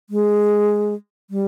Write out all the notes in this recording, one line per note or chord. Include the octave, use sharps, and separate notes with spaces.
G#3
G3